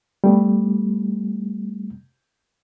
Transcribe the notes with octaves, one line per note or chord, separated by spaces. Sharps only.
G3 A3 B3